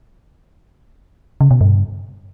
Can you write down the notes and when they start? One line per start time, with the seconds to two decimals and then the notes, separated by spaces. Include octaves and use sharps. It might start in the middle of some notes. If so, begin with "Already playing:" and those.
1.41 C#3
1.51 B2
1.61 G2